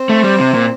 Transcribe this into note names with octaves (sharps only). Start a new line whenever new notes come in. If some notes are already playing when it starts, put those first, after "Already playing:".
Already playing: C4
A3
G3
C3
A#2